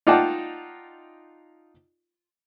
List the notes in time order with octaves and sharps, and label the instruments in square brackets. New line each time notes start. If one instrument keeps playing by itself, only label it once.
[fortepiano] D#4 F4 D5 F#5 G5 A5